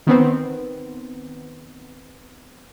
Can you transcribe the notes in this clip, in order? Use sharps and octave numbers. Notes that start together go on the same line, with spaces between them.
D#3 B3 C4